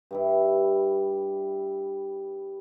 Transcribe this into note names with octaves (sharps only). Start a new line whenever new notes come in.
G2 G3 E4